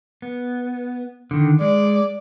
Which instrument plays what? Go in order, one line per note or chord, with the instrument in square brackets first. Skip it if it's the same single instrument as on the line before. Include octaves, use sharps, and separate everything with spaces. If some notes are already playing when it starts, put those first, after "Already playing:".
[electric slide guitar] B3
D3 D#3
[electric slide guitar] G#3 [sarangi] D5